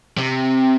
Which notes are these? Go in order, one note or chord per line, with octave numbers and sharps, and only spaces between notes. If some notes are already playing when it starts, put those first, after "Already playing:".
C3